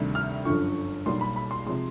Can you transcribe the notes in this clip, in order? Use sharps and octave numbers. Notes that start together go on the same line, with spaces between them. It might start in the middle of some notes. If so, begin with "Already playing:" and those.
Already playing: D2 C3 D#3 G3
F6
G1 F#2 D3 F3 C#6
B1 B2 G3 A#3 C6
B5
B5
C6
C3 F3 G#3 C6